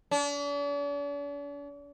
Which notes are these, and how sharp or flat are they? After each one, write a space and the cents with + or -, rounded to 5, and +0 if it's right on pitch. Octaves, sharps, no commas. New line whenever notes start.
D4 -45